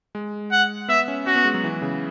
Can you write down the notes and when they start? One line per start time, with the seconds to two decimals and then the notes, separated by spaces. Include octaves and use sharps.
0.15 G#3
0.51 F#5
0.88 B3 E5
1.08 C#4
1.26 C#4 F#4
1.36 B3
1.45 G#3
1.54 F#3
1.64 E3
1.82 C#3